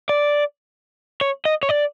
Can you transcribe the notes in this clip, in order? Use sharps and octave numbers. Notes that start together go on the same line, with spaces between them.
D5
C#5
D#5
C#5
D5